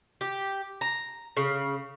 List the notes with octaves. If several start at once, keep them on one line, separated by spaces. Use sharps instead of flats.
G4
A#5
C#3